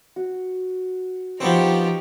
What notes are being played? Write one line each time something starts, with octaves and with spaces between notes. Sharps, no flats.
F#4
F3 B3 C4 D#4 G4 C#5